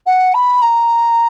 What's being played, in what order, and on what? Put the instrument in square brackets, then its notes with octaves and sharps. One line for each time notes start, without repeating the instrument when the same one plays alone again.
[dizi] F#5
B5
A#5